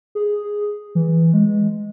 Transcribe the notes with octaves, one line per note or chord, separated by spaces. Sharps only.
G#4
E3
G#3